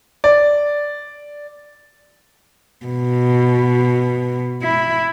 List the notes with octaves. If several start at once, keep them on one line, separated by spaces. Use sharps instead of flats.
D5
B2
E4